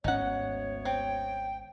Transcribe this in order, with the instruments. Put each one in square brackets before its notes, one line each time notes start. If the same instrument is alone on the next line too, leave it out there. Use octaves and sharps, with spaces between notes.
[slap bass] G#1 G#2 C#4 [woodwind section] D2 B3 C#5 [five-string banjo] D#4 F#5
[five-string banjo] C4 [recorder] G5